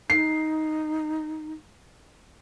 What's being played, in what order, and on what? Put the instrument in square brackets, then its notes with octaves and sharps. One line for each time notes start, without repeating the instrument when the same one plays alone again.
[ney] D#4 [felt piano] C7